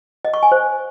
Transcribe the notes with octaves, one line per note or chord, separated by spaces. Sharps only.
D#5
C#6
G#5
C5